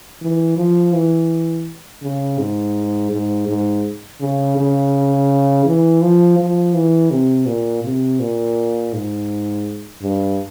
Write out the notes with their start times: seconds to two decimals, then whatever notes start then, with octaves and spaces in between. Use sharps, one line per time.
0.22 E3
0.57 F3
0.93 E3
2.02 C#3
2.39 G#2
3.11 G#2
3.48 G#2
4.21 C#3
4.58 C#3
5.65 E3
6.02 F3
6.39 F3
6.74 E3
7.11 C3
7.47 A#2
7.84 C3
8.20 A#2
8.93 G#2
10.02 G2